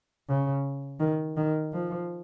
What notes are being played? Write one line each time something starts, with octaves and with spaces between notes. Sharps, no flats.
C#3
D#3
D#3
F3